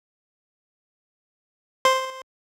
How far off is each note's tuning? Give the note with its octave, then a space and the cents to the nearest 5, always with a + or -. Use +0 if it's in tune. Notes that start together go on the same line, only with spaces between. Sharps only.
C5 +0 C6 +0